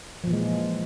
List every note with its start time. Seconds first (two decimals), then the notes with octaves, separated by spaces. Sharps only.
0.24 F3
0.27 A#2
0.30 E3
0.33 G#3